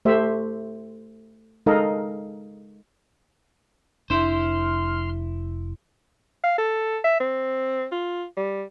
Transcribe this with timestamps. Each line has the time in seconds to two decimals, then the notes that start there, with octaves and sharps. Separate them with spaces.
0.05 A3 G4 C5 E5
1.66 G#3 D#4 A4 A#4 D#5 F5
4.10 F1 D4 E4 C5 C6 F6
6.44 F5
6.58 A4
7.04 E5
7.20 C4
7.92 F4
8.37 G3